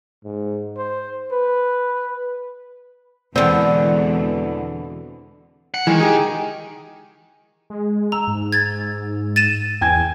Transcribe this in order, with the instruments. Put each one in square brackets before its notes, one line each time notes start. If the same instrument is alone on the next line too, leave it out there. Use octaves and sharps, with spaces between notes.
[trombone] G#2
C5
B4
[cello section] E2 E3 G#3 [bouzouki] B2 D3 [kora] C4
[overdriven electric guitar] F#5
[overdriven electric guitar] D#3 [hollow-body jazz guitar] E3 G#3
[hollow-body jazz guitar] G4 G#4
[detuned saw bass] G#3
[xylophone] A#5 [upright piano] E6
[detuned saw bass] G#2
[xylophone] G#6 A6
A6 D#7 E7
[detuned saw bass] E2 [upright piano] G5 G#5 G#6